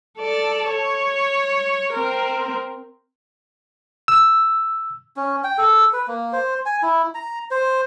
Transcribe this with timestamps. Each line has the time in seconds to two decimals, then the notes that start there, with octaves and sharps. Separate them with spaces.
0.18 A4 D5
0.69 C#5
1.93 C4 A#4
4.08 E6
5.16 C#4
5.44 G5
5.58 A4
5.93 B4
6.08 A#3
6.33 C5
6.66 G#5
6.82 E4
7.14 A#5
7.51 C5